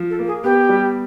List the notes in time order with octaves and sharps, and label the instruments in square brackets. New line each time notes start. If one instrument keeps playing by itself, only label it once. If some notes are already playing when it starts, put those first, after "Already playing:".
Already playing: [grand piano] F3
[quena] A4
[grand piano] A#3
[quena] G#4
[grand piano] B3 [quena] G4
[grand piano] G3